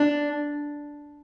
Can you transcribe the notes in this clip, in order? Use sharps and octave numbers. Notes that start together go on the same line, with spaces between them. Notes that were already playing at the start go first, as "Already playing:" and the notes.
Already playing: D4